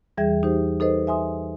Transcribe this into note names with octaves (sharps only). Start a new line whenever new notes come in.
E2 E3 G3 G#4 E5 G#6
D#4 G4 C5
D#4 A4 B4 C5 D#5
E5 G#5 C6 D#6